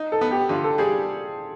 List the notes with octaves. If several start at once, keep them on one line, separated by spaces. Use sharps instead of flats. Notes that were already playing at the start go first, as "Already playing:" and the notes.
Already playing: D#4
A4
B3
G4
D3 F4
A4
G3 G#4